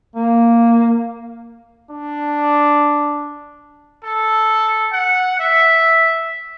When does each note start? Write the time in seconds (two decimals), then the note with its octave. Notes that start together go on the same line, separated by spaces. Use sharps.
0.16 A#3
1.91 D4
4.05 A4
4.92 F#5
5.40 E5